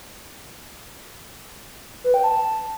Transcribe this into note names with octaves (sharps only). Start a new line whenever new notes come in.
B4
G5
A5